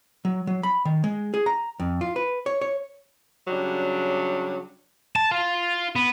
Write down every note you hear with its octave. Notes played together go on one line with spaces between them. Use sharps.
F#3
F#3
B5
D#3
G#3
G#4
A#5
F2
F4
B4
C#5
C#5
C#3 F#3 G3 D4
A5
F4
B3